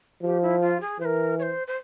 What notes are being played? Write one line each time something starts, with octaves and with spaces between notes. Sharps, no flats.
F3 G4
E4
F4
G#4
E3 C5
A#4
C#5
C5
C5